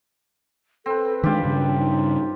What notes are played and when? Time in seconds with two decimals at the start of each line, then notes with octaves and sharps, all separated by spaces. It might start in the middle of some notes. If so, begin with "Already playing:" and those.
0.86 C4 A4 B4
1.23 D#3 G#3 D4 F4 G4
1.43 G2 C#3
1.78 D#4